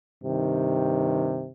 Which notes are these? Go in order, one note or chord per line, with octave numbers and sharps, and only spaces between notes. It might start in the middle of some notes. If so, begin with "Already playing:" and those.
G2 C3 D#3